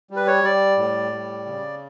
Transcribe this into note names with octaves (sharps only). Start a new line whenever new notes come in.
G3
B4
C#5
G3 D5
A2
G3
C#3